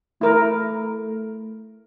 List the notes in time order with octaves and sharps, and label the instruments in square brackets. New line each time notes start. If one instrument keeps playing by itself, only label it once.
[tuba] A3 [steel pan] E4 A#4